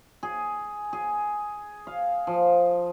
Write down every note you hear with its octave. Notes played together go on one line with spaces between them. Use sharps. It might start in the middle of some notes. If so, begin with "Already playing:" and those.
G#4
G#4
F5
F3